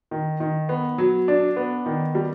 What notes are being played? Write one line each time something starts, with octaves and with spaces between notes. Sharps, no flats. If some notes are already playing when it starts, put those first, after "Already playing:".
D#3
D#3
B3
F#3
D4
B3
D#3
G3